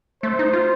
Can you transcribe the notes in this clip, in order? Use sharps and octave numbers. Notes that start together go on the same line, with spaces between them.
A3 C5
D#4
F4